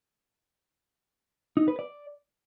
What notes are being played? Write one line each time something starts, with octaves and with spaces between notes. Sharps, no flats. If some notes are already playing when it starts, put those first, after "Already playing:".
D#4
B4
D5